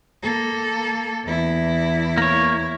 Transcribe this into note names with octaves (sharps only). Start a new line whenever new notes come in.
A#3 A4
E2 E4
A#3 C#5